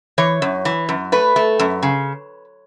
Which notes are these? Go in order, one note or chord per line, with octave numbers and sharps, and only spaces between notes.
E3 C#5
F#2
E3
F#2
A3 B4
A3
F#2
C#3